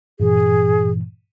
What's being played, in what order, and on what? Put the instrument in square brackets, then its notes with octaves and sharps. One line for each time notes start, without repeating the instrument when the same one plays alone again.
[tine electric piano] G2 A#2 E3 [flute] G#4